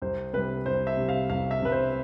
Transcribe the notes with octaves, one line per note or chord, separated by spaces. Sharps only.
C2 C5
C3 G3 B4
C2 C5
E5
C3 G3
F5
C2 F5
E5
C3 G3 B4
C5